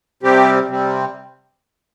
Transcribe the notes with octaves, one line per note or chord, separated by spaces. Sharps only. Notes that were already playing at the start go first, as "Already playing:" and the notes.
C3 G3 C4 G4
C3 G3 C4